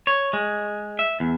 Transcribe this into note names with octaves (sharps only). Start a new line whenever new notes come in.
C#5
G#3
E5
E2